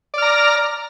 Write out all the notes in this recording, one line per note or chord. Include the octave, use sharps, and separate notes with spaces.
D5 A#5 F6